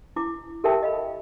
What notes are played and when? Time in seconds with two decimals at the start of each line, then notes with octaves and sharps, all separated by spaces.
0.16 E4 D6
0.64 G4 A4 A#4 E5 G5 A5
0.83 D#5 F5 B5